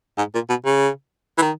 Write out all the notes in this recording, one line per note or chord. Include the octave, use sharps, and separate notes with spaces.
G#2
A#2
B2
C#3
E3
D#3